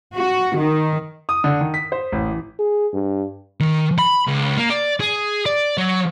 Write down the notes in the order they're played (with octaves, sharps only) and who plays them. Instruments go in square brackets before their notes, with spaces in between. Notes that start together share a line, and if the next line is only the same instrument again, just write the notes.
[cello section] F#4
D#3
[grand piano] D#6
D3
D#3
B6
C5
A1
E3
[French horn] G#4
G2
[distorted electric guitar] D#3
B5
C#2
A#3
D5
G#4
D5
F#3